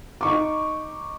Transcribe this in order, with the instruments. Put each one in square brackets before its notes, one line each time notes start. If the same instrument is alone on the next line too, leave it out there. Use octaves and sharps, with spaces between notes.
[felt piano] D#4 C#6 D6